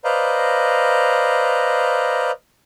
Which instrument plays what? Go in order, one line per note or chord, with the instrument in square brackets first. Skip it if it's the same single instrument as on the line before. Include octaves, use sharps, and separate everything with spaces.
[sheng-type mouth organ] B4 C5 D5 D#5 F5 A#5